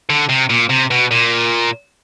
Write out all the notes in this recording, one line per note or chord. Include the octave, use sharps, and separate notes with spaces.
D3
C3
A#2
C3
B2
A#2